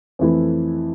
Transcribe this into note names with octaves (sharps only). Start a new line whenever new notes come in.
F2 E3 A3 E4